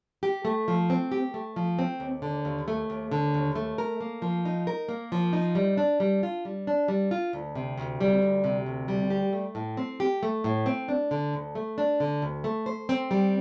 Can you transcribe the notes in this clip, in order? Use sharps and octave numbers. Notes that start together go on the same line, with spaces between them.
G4
A3
F3
C4
G4
A3
F3
C4
D#2
D3
D#2
A3
D#2
D3
D#2
A3
A#4
A#3
F3
D#4
A#4
A#3
F3
D#4
G3
D4
G3
F4
G3
D4
G3
F4
D2
C3
D2
G3
D2
C3
D2
G3
G4
A3
A2
C4
G4
A3
A2
C4
D4
D3
D2
A3
D4
D3
D2
A3
C5
C4
G3